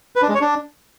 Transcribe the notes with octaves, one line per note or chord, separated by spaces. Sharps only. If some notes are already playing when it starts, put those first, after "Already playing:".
B4
D4
G#3
C#5
D4